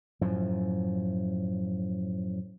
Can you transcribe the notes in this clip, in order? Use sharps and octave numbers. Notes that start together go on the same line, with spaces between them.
F#2 A2 F3